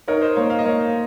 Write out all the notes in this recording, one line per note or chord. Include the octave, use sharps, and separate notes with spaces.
D#4 A#4 C#5
C5 D#5
A#3 C#5 F5
F5
D#5
A#3 C#5 F5